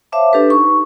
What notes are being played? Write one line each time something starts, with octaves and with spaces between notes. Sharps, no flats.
C5 C#5 E5 F5 A5 D6
D4 G4 A4 B4
D#4 C#6